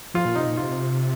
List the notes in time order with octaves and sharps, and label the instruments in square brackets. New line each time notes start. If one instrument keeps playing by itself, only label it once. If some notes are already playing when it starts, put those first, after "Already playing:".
[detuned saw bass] F3 [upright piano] F4
[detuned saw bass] A#2
[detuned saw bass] C3 [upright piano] D#4
[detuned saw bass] A#2
[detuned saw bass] C3 [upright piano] F4